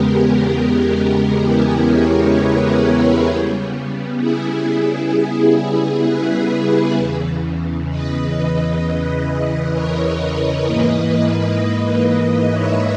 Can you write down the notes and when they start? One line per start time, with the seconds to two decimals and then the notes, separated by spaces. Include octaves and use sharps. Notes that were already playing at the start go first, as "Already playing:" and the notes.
Already playing: E2 C#3 G#3 B3 G4 A#4
1.42 E4 G#4
1.88 A#4 C#5
2.34 G#4 B4
3.26 C#3 G3 B3
4.18 E4 G#4
6.04 G#4 B4
6.96 E2 C#3 E3
7.88 B4 D#5
9.72 A#4 C#5
10.19 A#4 C#5
10.66 G#2 E3 A#3 B4 D#5
12.50 C#5 E5